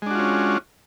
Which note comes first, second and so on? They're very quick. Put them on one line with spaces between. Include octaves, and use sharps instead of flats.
G#3 D4 F#4 F4 C#4